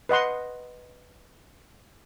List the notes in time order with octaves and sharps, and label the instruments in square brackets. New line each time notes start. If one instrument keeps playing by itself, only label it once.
[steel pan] B4 D#5 F#5 C6